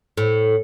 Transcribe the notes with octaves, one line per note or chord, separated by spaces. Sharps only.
A2